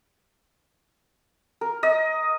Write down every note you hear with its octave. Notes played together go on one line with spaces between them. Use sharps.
A#4
D#5